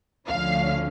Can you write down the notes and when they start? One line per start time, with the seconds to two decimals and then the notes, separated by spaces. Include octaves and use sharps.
0.28 D2 D3 F3 A3 C#4 F5